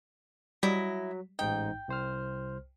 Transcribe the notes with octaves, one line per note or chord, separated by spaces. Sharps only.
F#3 G3 E4 D#5
A1 G#2 D#4 G5
C2 C5 F6